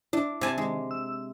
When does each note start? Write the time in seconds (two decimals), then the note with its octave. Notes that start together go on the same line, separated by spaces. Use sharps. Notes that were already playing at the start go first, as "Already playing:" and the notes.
0.13 D4 E4
0.41 C3 G#5 A5
0.58 D#3 G#3
0.91 E6